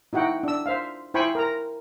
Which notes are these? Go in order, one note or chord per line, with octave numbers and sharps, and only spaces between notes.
D#4 E4 F#4 F#5 G5
D4 E6
C5 E5 F5
E4 C5 G5 G#5 B5 C#6
A#4 A#5